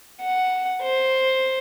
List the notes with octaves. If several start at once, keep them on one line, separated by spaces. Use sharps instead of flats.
F#5
C5